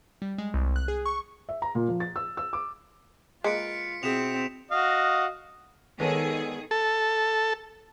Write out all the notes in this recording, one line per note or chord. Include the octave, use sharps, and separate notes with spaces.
G3
G#3
C2
F#6
G#4
C#6
E5
A#5
A#2
F3
A6
E6
E6
D6
G#3 A#3 F4 B4 B6 C#7 D7
B2 C4 E4 G#4 B6 E7 F7
F#4 D#5 F5
D#3 G#3 B3 G#4 A4 B4 C#5 D5
A4